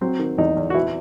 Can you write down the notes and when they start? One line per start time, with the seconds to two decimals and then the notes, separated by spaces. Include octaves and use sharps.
0.01 F#3 C4
0.19 D#3
0.38 E2 D#4
0.57 E2
0.70 F#4
0.74 E3 E4